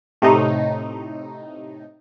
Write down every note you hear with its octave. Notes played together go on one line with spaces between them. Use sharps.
A2 C3 A3 D#4